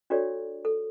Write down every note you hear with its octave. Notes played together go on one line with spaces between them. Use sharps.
D4 F#4 G4 A4 C#5 D5
A4